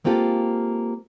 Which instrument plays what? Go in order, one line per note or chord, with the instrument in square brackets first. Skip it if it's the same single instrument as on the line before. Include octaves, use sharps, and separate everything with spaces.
[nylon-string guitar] G#3 A#3 C4 F4 G4 A4